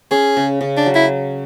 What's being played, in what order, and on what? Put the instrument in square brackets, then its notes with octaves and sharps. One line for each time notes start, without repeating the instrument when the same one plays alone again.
[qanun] C#4 [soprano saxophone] G#4
[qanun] C#3
C#3
[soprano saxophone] D4
[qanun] F#3
[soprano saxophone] E4